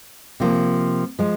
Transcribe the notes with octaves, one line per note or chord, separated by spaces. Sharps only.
C3 F3 A#3
F3 G#3